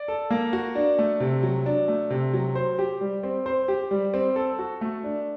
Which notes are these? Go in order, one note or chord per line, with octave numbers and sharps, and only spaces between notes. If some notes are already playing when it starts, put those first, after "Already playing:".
Already playing: D5
A4
A#3
F#4
D4
A3
C3
F#3
D4
A3
C3
F#3
C5
G4
G3
C4
C5
G4
G3
C4
A4
F#4
A3
D4